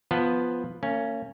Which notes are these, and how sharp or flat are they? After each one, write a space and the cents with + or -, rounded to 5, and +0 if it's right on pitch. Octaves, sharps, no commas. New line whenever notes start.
F3 +0 B3 +0 A5 +15
A#3 -40 C#4 +0